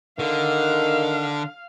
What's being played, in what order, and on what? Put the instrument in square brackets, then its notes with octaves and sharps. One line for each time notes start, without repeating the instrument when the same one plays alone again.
[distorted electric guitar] D3 [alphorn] D#3 [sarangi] F5